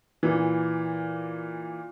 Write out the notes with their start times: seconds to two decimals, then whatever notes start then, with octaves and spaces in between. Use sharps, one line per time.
0.23 A#2 E3